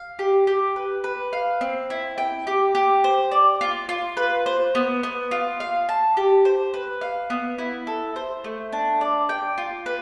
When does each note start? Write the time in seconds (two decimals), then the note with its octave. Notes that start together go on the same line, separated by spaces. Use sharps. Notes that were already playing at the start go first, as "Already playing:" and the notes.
Already playing: F5
0.19 G4
0.47 G4
0.76 B4
1.04 B4
1.33 F5
1.61 C4
1.90 E4
2.18 G5
2.47 G4
2.75 G4
3.04 C5
3.31 D5
3.61 F4
3.89 F4
4.17 B4
4.46 C5
4.75 B3
5.03 B3
5.31 F4
5.60 F5
5.89 A5
6.17 G4
6.45 C5
6.74 B4
7.01 F5
7.30 B3
7.58 E4
7.87 A4
8.16 C5
8.44 A3
8.72 D4
9.01 D5
9.29 G5
9.58 F4
9.86 B4